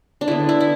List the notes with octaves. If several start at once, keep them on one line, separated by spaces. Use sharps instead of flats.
D4
D3 G#3 B3 E4
E4
E4